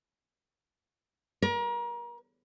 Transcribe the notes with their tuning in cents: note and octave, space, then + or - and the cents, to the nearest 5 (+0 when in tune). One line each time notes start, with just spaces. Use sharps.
A#4 +35